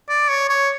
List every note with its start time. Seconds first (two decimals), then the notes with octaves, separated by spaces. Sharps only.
0.09 D5
0.29 C#5
0.49 C#5